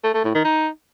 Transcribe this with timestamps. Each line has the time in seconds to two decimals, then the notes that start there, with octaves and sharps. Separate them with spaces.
0.04 A3
0.14 A3
0.24 A2
0.34 D#3
0.45 D#4